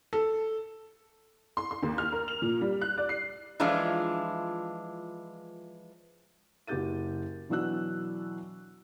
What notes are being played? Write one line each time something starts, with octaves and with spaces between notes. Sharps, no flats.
A4
C6
C6
D#2
F6
A#4
F7
A#2
G3
F#6
D5
C7
E3 F3 G#3 D4 F4
F#1 F#4 G4 G6 A6 D#7
B2 E3 F#3 D4 E6 F#6